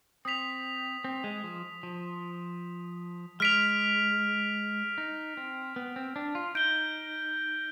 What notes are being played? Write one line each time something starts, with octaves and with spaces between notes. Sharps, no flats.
C4 D#6 B6 F7
C4
G#3
F3
F3
G#3 F6 B6 D7 F7
D#4
C4
B3
C4
D4
F4
D#4 G6 D7 G7